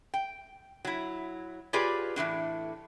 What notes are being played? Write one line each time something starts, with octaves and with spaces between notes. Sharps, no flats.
G5
F#3 E4
F4 G4 G#4 B4 C#5 D5
A2 E3 C4 D4